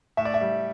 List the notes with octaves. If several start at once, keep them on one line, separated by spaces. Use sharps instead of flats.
A2 E5
D5
E5
G3